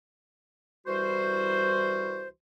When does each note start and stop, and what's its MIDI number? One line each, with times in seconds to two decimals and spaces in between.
0.87 2.28 36
0.87 2.28 52
0.87 2.28 55
0.87 2.28 66
0.87 2.28 72